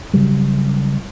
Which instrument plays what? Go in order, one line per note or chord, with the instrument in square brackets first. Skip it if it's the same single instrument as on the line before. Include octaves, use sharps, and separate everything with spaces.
[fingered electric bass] C#3 F#3 G3